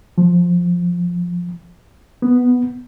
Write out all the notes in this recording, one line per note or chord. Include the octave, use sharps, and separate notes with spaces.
F3
B3